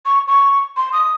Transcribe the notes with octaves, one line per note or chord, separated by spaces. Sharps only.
C#6
C#6
C6
D#6